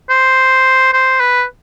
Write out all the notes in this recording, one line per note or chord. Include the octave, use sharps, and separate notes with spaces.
C5
C5
B4